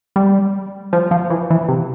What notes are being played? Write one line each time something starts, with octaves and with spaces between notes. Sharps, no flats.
G3
F3
F3
E3
E3
C3